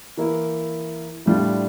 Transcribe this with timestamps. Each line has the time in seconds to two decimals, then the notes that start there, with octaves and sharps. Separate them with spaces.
0.17 E3 A#3 E4
1.26 A2 G3 D4 F4